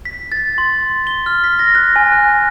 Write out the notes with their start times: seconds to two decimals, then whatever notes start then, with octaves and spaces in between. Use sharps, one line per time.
0.05 B6
0.32 A6
0.58 C6
1.07 G7
1.26 F6
1.44 B6
1.59 A#6
1.75 F#6
1.96 G#5
2.12 F#6